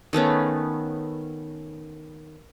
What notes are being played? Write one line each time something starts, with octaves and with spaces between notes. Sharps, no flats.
D#3 A3 B3 C#4